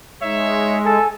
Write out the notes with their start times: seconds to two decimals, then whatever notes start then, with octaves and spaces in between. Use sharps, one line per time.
0.22 G#3 D#4 C#5 E5
0.85 A4 G#5